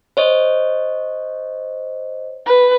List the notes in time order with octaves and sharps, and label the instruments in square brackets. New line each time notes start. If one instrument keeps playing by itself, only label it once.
[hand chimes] C5 C#5 D#5
[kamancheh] B4